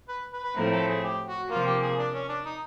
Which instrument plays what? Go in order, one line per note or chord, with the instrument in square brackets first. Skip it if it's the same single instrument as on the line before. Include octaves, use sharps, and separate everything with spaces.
[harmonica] B4
B4
B4
[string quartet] A2 F3 A3 C4 E4 [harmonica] A#4
[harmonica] A4
G#4
G4
F#4
[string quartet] C3 F3 A#3 [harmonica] F4
[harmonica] G4
G#4
D4
C#4
D4
D#4